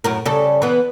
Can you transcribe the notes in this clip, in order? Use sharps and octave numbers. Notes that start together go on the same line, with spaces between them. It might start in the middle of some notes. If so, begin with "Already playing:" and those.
F#2 A2 A#4
C#3 G3 A4
E3 B3